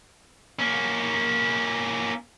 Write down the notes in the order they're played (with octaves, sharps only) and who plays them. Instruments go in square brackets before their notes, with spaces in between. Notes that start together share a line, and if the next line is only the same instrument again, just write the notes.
[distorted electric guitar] A#3 C#4